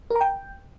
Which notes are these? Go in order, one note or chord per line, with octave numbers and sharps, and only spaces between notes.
A#4
A#5
G5